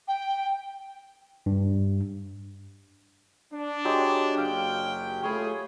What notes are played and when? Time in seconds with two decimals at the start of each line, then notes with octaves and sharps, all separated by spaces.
0.08 G5
1.46 G2
3.53 D4
3.85 F#3 G#3 G4
4.38 F#1 F#3 F5 G5
5.24 A3 F4 G#4 C#5 B5